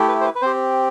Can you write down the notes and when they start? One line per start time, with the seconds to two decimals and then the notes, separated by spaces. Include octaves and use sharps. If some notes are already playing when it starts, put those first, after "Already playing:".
Already playing: A3 E4 G4
0.08 B4
0.21 C5
0.25 B4
0.35 B4
0.42 C4 G4 C5